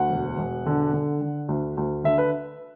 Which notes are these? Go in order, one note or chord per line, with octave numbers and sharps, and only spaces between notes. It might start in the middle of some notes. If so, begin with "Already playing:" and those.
Already playing: D2 F#5
E1
E1
D3
D3
D3
D2
D2
D3 E5
B4